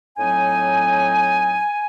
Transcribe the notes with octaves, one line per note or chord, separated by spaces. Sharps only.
A2 F#3 C4 D#4 G#5